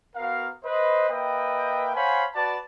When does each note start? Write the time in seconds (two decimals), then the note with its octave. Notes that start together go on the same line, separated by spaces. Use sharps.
0.16 B3 F#4 A#4 F5
0.64 B4 C5 D#5
1.10 A#3 B4 D#5 E5 G5
1.96 C5 C#5 F5 F#5 G#5 B5
2.35 F#4 B4 D5 A5